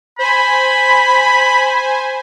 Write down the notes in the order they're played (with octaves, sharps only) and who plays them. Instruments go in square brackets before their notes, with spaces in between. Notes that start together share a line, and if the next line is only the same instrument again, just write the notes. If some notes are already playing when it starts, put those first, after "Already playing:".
[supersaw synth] C5 G#5 [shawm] B5